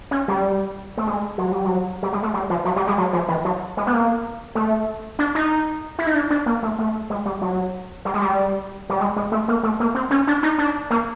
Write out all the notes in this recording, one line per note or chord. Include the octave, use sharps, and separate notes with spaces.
C#4
G3
A3
G#3
F#3
G3
F#3
G3
G#3
A3
G3
F3
F#3
G3
G#3
F#3
F3
E3
F#3
G#3
B3
A#3
A3
D4
D#4
E4
D#4
D4
D4
A#3
A3
A3
G#3
G3
F#3
G3
G#3
G3
G3
G#3
G#3
A3
A#3
A3
A#3
C4
C#4
D4
D#4
D4
A#3